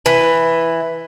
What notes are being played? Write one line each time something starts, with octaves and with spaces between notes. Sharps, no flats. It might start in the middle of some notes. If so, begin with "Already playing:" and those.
E3